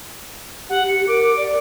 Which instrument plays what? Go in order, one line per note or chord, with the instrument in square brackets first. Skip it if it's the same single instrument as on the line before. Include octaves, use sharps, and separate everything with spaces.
[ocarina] G4 [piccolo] F#5
[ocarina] G4 [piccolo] C#7
[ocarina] A#4 [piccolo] D6
[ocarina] D5